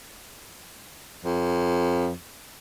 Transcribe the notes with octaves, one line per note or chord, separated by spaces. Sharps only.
F2